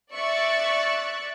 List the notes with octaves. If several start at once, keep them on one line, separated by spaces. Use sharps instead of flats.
D5 E5 C#6 E6 F#6 A6